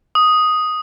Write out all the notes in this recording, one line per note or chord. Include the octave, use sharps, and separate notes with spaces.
D#6